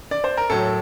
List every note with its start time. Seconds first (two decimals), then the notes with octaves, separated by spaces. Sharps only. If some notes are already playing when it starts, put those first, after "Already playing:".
0.11 D5
0.24 C5
0.37 A#4
0.50 A2 F#3 A4